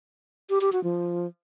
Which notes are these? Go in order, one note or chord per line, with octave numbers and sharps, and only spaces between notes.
G4
G4
F#4
F3